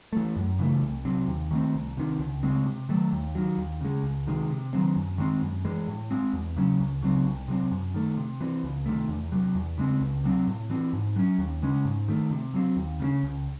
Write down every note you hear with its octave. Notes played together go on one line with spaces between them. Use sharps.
E3 A3
F#2
C#3 E3 A3
C2
C3 F#3 C4
D#2
D#3 A3 C4
C2
C3 D#3
C#2
C#3 G#3 C4
C3
D#3 F#3 A3
D#2
D#3 F#3
D#2
C#3 G#3
C#2
C3 D#3 G#3
C3
D#3 F#3 C4
F#2
D#3 G#3 C4
F#2
E3 G#3
A2
G#3 C4
E2
C#3 F#3 C#4
C#2
C#3 F#3 C4
C2
C3 F#3 C4
F#2
D#3 A3
C3
E3 C4
C#2
C3 D#3 A3
E2
C3 F#3
E2
C#3 G#3 C4
C#2
C3 F#3 C4
A2
E3 C4
G#2
F#3 C#4
D#2
C#3 G#3 C#4
G#2
D#3 A3
C3
F#3 C4
D#2
C#3 G#3 C#4
C#2